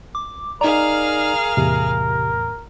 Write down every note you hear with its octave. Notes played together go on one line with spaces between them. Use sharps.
D6
D#4 G#4 A#4 D5 F5 A#5
E2 A2 C3